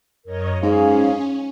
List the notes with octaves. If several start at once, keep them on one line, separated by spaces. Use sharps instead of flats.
F#2 A#4 C#5 D#5
G#2 C#4 G#4 F5